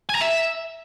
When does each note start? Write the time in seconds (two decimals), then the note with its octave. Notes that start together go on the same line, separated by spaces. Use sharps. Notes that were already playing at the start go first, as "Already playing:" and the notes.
0.09 G#5
0.15 A#5
0.21 E5